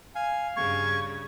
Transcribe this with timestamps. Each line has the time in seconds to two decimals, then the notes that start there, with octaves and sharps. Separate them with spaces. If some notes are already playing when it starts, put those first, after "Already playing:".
0.15 F5 G#5
0.56 G2 C#3 C#6 G#6